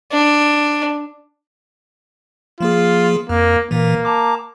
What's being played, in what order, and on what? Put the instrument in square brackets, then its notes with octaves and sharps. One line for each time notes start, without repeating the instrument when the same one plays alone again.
[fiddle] D4
[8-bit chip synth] F3 A#3 G#4 [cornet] F4
[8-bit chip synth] F2 [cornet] A#3
[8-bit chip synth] A#2 E3 [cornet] A#3
[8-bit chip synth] A5 A#5 D6